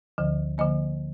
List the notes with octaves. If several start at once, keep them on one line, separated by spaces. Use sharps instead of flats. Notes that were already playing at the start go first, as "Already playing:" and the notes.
D2 D3 F3
D3 F3 A#3 D#5